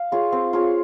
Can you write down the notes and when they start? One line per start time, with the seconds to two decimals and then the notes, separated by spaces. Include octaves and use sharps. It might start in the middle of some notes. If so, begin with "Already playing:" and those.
Already playing: F5
0.12 F4 G#4 C#5
0.32 C4
0.53 F4 G#4 C#5